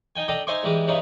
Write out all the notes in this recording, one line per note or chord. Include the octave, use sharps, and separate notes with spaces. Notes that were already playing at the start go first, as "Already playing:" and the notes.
D#4 G5 G#5
D4 A4 D#5 G5 A#5
D#4 C5 E5 G#5 C6 D6
G#2 E3 G3 G#3
G2 C#3 E3 D#4 E4